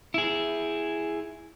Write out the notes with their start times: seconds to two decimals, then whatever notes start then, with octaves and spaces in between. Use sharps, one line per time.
0.14 E4 G#4